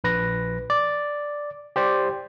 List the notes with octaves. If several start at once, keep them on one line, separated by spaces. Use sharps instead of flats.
A#1 B4 A#6
D5
G4 C5 D5